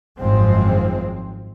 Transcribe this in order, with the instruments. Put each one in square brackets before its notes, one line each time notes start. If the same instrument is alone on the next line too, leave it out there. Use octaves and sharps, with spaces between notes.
[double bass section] G#1 F#2 F3 G#3 C4